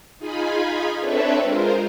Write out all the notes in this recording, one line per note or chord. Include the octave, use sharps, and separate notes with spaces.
D#4 F4 G#4 G#5 B5
C4 D4 A4 B4 C#5 E5
G#3 F4 A#4 C5